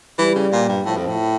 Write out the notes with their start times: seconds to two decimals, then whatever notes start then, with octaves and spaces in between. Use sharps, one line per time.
0.19 E3 G3
0.36 C#3
0.53 A#2
0.69 G2
0.86 A2 F3
0.97 F2
1.08 A2